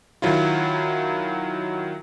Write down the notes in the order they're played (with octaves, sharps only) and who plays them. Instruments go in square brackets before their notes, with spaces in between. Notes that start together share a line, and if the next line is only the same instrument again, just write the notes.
[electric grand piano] D#3 F#3 E4 F4